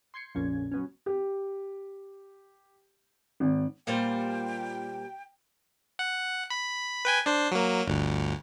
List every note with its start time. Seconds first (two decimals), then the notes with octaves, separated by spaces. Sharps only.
0.14 C6 G6 G#6 C7 C#7
0.35 A#1 F2 A#2 C#3 C#4 G#6
0.72 F#3 B3 C#4
1.06 G4
3.40 G#1
3.87 A#2 G3 A#3 C5 G5
5.99 F#5
6.50 B5
7.05 B4 G5 G#5
7.26 D4 C5
7.51 F#3 A#3
7.88 G1 D2